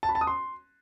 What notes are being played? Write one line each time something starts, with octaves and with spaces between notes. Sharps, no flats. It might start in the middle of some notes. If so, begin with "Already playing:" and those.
A5
B5
A5
D#6
C6